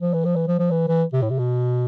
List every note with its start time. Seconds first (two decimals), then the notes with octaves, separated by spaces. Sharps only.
0.02 F3
0.13 E3
0.25 F3
0.36 E3
0.48 F3
0.59 F3
0.71 E3
0.88 E3
1.13 C3
1.22 A2
1.30 C3
1.39 B2